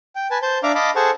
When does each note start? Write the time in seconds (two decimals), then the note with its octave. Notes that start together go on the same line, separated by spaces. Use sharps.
0.16 G5
0.31 B4 G#5 A5
0.42 C5 A5 G6
0.63 D4 D5 E5 F5 A#5 D6
0.75 D#5 F5 A5 B5 D6
0.96 G#4 A4 C5 F#5 A5 C#6